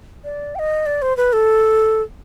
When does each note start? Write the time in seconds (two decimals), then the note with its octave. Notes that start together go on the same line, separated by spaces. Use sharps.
0.24 D5
0.55 G5
0.59 D#5
0.86 D5
1.02 C5
1.17 B4
1.33 A4